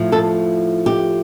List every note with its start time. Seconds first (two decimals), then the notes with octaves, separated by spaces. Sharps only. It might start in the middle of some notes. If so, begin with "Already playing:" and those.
Already playing: A2 F3 A3
0.12 A4
0.86 G4